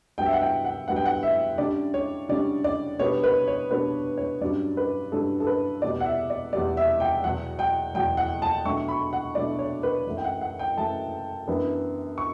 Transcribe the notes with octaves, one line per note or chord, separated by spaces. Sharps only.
G2 F#3 B3 G5
E5
F#5
G5
F#5
G2 F#3 B3 F#5
G5
F#5
E5
D3 G3 C#4 D5
C#5
D3 G3 C#4 D5
D5
B2 G3 B3 D4 C#5
B4
C#5
B2 G3 B3 D4 B4
C#5
G2 D3 F#3 C#4 D5
B4
G2 D3 F#3 C#4 A4
A4
B4
E2 B2 G3 D5
F#5
E5
D5
E2 B2 G3 D5
E5
G5
E2 B2 F#3 F#5
G5
E2 B2 F#3 G5
F#5
A5
B2 F#3 A3 D4 C#6
B5
F#5
B2 F#3 A3 D4 D5
C#5
B4
F#2 E3 A3
G5
F#5
F#5
G5
F#2 E3 A3 A5
F#2 E3 B3 D4
C#6